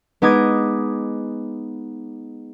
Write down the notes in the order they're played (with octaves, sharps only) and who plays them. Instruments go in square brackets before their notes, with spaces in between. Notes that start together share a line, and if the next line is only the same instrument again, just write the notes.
[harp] G#3 B3 D#4 D6 D#6 G#6